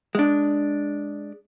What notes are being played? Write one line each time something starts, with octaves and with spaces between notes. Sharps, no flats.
G#3 D4